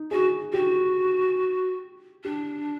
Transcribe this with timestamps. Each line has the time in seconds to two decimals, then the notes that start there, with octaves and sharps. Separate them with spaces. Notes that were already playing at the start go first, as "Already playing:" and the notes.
Already playing: D#4
0.11 F#4 G#4
0.53 F#4 G4
2.24 D4 G4